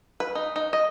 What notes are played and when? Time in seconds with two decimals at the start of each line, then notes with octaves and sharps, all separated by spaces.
0.20 B4
0.35 D#4
0.56 D#4
0.73 D#5